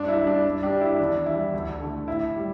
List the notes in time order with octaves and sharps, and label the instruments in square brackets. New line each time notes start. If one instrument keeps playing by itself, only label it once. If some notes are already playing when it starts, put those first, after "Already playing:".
Already playing: [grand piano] G2 D4
E4
G3
D4
G2
D4 G4
G3
E4
E2 D4
E3 G3 E4
D2
D3 A3
A2 E4
G3